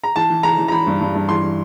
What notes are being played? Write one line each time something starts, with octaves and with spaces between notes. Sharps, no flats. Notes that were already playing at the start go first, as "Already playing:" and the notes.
A#5
E3 A5
E3
E3 A#5
E3
A#5
E3 B5
G2
G2
G2
E3 C6
E3